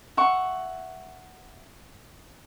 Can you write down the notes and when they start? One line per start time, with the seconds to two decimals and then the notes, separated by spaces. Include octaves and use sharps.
0.17 E5 F#5 C#6